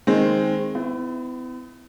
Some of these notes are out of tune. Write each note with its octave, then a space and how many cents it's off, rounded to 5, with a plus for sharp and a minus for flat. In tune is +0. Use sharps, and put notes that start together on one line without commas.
D#3 +0 G#3 +0 C4 +0
B3 +45 E4 +0